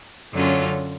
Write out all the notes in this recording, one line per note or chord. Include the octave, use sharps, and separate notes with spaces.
F#2 D3 F#3 C#4 F4